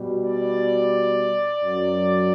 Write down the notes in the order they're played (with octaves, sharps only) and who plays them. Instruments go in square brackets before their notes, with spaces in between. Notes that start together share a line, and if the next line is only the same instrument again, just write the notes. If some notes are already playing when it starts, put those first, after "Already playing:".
Already playing: [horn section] B2 G3
D5
F#2 F#3